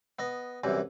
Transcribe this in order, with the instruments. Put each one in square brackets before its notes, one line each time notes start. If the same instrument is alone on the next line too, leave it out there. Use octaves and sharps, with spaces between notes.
[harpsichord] B3 D#5
C2 F#2 E3